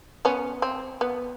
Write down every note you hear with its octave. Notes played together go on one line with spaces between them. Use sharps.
B3 C#4
C4
B3